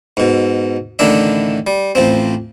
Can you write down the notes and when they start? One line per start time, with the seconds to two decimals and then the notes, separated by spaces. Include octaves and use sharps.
0.17 G#2 B2
0.99 A1 A2 D3 D#3 D4 E5
1.67 G3
1.95 A1 F3 C4